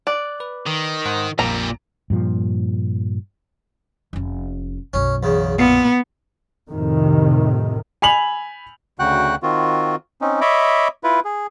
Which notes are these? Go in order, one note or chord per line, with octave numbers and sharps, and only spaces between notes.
D5 F#6
B4
D#3
G#2 C5 F#5
A#1 F2 A#2 G3 A#3 A#5
G2 A#2 F3
F1 C#4
B1 F#2 C#4
E2 C#3
A#2 B3
F2 A2 C3 D#3
G#5 B5 F7 F#7
D2 C#3 F#4 F#5 G5 F#6
D#3 C4 F4 F#4
C4 C#4 D#4
C#5 D#5 E5 B5 D6
E4 F4 B4
G#4